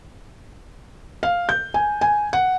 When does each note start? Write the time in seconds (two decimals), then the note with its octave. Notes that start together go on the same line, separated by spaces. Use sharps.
1.23 F5
1.49 G6
1.74 G#5
2.01 G#5
2.33 F#5